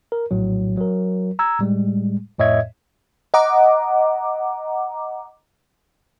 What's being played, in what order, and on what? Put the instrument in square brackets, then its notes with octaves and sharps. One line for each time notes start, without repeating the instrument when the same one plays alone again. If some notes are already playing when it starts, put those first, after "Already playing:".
[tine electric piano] A#4
A#1 A2 F#3
F#3 A#4
A#5 E6 G#6
A2 G3 G#3
F2 A2 C#5 D#5 E5 G#6
[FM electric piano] D#5 F#5 A#5 D6